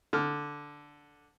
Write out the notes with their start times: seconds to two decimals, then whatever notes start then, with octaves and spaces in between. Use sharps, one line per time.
0.13 D3 F6